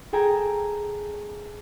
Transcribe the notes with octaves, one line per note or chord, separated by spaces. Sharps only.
G#4 A4 G5 G#5 A#5